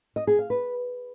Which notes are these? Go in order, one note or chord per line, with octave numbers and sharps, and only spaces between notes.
D#5
G#4
F5
B4